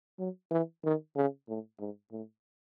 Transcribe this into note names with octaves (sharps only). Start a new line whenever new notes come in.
F#3
E3
D#3
C#3
A2
G#2
A2